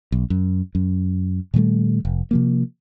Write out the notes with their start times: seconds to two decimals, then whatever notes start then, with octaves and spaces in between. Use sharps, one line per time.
0.12 B1
0.30 F#2
0.75 F#2
1.54 A#2 D#3 G3 A3
2.05 F1
2.31 C3 F3 A#3